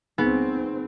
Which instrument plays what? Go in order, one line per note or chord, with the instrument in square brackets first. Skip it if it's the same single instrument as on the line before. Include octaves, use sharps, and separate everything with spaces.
[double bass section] C#2 C4 [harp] B3 [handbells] D#4 G#4